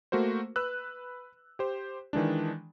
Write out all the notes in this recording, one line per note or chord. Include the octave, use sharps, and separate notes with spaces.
A3 A#3 F#4 A#4 C5
B4 E6 F#6
G4 C5
D#3 E3 G#3 D4